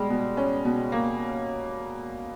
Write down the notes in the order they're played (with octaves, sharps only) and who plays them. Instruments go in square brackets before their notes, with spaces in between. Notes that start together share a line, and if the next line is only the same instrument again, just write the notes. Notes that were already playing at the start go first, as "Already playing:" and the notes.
Already playing: [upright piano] B2 G#3 [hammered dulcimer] G3
[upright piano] B2
C#4
B2
A#3